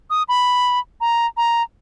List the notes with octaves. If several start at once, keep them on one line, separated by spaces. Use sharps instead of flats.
D#6
B5
A#5
A#5